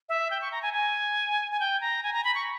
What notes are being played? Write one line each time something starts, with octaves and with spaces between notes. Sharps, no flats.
E5
G5
C#6
A#5
G#5
G#5
G#5
G5
A#5
G#5
A#5
B5
C#6